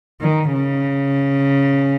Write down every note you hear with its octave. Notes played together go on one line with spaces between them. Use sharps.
D#3
C#3